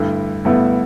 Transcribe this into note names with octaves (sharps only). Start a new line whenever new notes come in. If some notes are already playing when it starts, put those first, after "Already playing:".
Already playing: G2 D3 A3 E4
G2 D3 A3 B3 E4